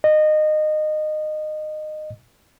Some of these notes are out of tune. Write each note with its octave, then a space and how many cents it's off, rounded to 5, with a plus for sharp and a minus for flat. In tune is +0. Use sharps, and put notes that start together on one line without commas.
D#5 -20